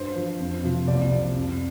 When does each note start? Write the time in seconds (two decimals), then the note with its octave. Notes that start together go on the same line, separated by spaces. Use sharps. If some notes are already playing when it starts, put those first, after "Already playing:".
Already playing: G2 C5
0.16 F3
0.40 F2
0.63 C3 F3
0.88 C2 D5
1.11 C3 F3
1.35 F2